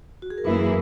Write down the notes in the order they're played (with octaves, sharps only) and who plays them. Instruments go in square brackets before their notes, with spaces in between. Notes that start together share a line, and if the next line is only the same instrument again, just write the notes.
[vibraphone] F#4
G#4
A#4
[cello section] F#2 E3 A#3 E4 G#4 [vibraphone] B4
[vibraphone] A#4